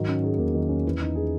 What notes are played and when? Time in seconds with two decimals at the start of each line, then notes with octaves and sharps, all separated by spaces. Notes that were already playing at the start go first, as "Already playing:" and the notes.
Already playing: G#2 D#3 F#3
0.09 C#4
0.24 G#4
0.38 E2 A#3
0.55 D#3
0.69 C#4
0.85 E3
1.01 D#4
1.15 G#4